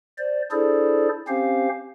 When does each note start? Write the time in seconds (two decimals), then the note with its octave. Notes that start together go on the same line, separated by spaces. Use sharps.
0.18 C5 D5
0.52 D4 E4 G#4 A4 C5 D5
1.28 C4 C#4 G4 C5 F5